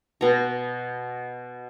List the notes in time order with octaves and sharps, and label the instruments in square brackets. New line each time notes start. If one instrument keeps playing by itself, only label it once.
[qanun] B2 A#5